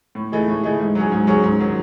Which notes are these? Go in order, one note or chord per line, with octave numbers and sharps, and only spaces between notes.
A2
E3 A3 D#4 G#4
A2
E3 A3 D#4 G#4
G#2
F#3 C#4 G#4
G#2
F#3 C#4 G#4
G#2
D#3 F#3